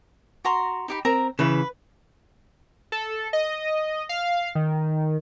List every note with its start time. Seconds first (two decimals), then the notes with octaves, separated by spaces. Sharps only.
0.45 F#4 A#5 C6
0.88 D#4 G4 B5
1.05 C4 A#4 A#5
1.39 C#3 E3 B4
2.92 A4
3.33 D#5
4.09 F5
4.55 D#3